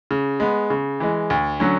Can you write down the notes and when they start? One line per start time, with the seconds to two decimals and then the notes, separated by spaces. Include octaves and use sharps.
0.11 C#3
0.40 G#3 B3
0.70 C#3
1.00 E3 G#3
1.30 D2
1.60 D3 F#3 C#4